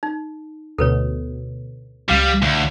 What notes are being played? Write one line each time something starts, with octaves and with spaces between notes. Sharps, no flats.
D#4
D2 B2 A4 B4 C#5
C#2 G3 F5 C7
D2